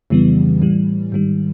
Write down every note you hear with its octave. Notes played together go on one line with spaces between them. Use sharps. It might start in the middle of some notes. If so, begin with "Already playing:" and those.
F2 C#3 E3 G3 B3
A2 E3 G3
G#2 D#3 G3